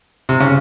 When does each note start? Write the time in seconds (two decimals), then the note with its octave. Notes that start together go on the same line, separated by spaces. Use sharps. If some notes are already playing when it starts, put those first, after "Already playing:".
0.29 C3
0.40 C#3